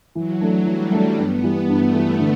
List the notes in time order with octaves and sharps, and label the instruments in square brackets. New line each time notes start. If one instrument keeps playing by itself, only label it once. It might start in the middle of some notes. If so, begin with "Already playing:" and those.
[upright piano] E3 [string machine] F#3
[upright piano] A3 D4 A4
[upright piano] E3 [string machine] G3
[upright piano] A3 D4 A4
[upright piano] G2 [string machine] B3
[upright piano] E3 G3
[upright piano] G2 [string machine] A3
[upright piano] E3 G3
D3